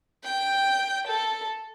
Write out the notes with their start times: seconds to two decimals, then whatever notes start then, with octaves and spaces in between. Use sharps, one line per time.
0.24 G5
1.07 A4